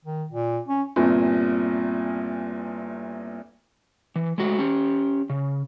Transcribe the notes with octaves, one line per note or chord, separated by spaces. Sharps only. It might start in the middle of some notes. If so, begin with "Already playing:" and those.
D#3
A#2
C#4
G1 C2 A#2
E3
G#3 A3 F#4
C#4 G4
C#3